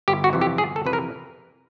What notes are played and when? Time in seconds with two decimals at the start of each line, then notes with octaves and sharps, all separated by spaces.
0.08 G1 G4
0.24 F#4
0.33 F2 C3 E3
0.41 G4
0.58 G1 G#4
0.76 A4
0.85 F2 C3 E3 B4
0.93 A#4